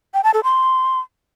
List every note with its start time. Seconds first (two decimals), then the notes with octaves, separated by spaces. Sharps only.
0.14 G5
0.24 A5
0.34 A4
0.44 C6